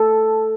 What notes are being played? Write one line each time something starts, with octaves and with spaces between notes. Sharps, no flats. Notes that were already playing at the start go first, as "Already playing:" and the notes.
Already playing: A4